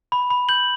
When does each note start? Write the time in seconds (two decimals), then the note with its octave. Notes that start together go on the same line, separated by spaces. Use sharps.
0.12 B5
0.30 B5
0.49 G6 F#7